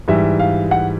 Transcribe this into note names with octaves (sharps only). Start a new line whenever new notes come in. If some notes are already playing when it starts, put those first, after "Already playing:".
G#2 E3 G3 E5
F5
F#5